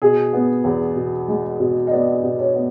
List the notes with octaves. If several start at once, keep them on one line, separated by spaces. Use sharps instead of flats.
B2 G#4
B3
E2
B2
G#3
B2
D#5
B3 D5
B2
C#5
B3